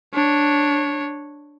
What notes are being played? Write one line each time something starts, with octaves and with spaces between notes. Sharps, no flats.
D4 C#5